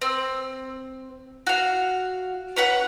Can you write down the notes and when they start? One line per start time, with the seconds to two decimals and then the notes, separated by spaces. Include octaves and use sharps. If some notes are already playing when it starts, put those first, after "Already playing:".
0.02 C4
1.47 F#4 F5
2.56 C#4 B4 F#5